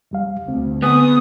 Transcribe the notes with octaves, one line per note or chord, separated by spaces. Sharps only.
F2 G3 F5
D2 C4
D3 B3 G#4 D#6